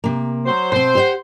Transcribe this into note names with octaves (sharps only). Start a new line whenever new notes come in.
C3 A#3
F#3 C5
B2 C4 C5
G4 C#5 F#5